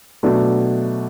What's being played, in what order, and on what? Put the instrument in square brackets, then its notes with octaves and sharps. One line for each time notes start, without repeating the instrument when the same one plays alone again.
[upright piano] B2 F#3 A3 D4